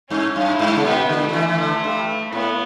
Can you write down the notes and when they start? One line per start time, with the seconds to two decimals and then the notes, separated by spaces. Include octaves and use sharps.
0.10 G2 C#4
0.36 F#2
0.48 E4
0.59 G2
0.76 C#3
0.85 B2 B3
1.09 D3
1.22 A3
1.29 D3
1.33 E3
1.48 E3
1.58 D3
1.84 G2
2.32 A2 B3